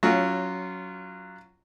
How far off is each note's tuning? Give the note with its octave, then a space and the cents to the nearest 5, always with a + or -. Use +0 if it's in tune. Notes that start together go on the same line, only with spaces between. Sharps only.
F#3 +0 C#4 +15 F4 -15